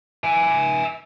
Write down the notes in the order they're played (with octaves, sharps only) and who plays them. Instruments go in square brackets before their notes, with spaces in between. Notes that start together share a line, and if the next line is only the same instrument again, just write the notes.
[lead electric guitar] E5 G#5